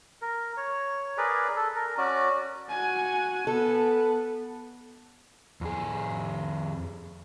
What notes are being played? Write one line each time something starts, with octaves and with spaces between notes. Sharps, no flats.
A#4
C#5
G#4 A#4 B4 D5
A4
A#4
C#4 F#4 D5
F#4 G#5
B3 A4
F2 G#4